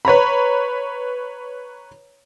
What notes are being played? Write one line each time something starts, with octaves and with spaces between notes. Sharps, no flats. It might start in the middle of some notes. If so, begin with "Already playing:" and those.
B4 C#5 A#5 B5